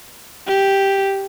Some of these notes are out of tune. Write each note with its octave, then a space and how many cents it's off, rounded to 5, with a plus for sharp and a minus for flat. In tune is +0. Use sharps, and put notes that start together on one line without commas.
G4 +0